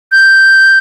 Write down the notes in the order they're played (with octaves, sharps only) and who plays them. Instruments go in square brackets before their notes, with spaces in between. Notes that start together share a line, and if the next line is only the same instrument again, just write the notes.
[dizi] G6